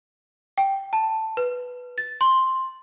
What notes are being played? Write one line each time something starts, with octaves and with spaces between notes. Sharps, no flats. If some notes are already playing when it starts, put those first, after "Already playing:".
G5
A5
B4
A6
C6